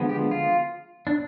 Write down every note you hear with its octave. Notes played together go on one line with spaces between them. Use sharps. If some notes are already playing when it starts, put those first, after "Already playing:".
Already playing: D3 F3 G#3 B3
G4
F4
D4